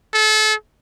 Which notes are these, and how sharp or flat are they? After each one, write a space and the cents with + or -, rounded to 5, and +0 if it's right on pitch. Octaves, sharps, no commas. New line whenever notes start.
A4 -30